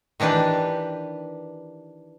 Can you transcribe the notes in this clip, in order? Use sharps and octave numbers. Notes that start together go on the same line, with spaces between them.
D#3 E3 D4 G4 B4